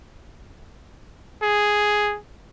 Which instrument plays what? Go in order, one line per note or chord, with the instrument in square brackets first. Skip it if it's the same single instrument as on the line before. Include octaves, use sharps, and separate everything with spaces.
[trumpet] G#4